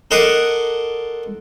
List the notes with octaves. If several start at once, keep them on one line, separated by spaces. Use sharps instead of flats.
A4 A#4 D#5 F#5 C6 D6